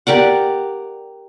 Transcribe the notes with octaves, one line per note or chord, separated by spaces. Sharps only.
G4 A#4 D5 F#5